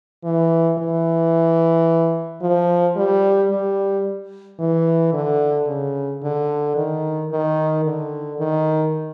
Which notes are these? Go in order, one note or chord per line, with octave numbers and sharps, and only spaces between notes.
E3
E3
F3
G3
G3
E3
D3
C#3
D3
D#3
D#3
D3
D#3